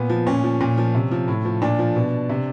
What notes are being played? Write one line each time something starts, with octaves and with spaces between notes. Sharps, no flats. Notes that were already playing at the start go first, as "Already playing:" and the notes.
Already playing: A#2 B3
F3
A#2 C#4
F3
A#2
F3
C3
F3
A2
F3
A#2 D4
F3
B2
C3